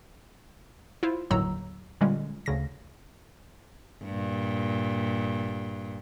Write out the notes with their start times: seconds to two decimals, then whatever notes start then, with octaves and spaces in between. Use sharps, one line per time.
1.03 E4 F4 C5
1.30 G1 D#2 A2 F#3 A#5 E6
2.01 A#2 D3 G3 G#3 C#4
2.46 D2 C#3 A#6
4.05 G2 A#2